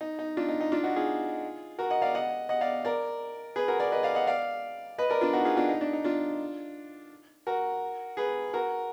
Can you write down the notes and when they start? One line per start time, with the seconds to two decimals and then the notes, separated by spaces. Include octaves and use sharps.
0.01 D#4
0.19 D#4
0.37 D4 F4
0.49 D#4
0.61 D#4
0.72 D4 F4
0.83 D#4 F#4
0.96 F4 G#4
1.79 F#4 A#4
1.90 D#5 F#5
2.02 D5 F5
2.15 D#5 F#5
2.49 D#5 F#5
2.61 D5 F5
2.85 A#4 D5
3.56 G#4 B4
3.68 F#4 A#4
3.80 A#4 D5
3.92 B4 D#5
4.03 D5 F5
4.15 D#5 F#5
4.27 D5 F5
4.98 B4 D#5
5.10 A#4 D5
5.21 D4 F4
5.33 D#4 F#4
5.45 F4 G#4
5.57 D4 F4
5.69 D#4
5.81 D4
5.93 D#4
6.04 D4 F4
7.47 F#4 A#4
8.17 G#4 B4
8.53 F#4 A#4